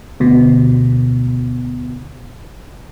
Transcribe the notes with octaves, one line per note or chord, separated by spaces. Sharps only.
D2 B2